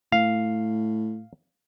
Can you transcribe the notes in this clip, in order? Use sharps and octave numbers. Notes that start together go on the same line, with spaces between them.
A2 F5